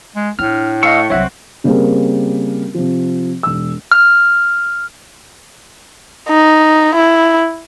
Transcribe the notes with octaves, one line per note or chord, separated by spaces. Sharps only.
G#3
A2 D4 F6
A3 D#5 F5 C#6 E6
C2 F#3 C4 F#4 C#5 E5 F#5
C#3 G3 A#3 C4 G#4 A#4
C3 F3
E1 E6
F6
D#4
E4